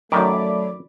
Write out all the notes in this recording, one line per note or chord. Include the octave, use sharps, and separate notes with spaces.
F#2 D#3 F#3 A3 D5 B5 D6